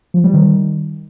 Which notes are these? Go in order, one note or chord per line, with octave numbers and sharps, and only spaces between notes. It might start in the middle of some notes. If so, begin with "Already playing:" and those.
F3
G3
D#3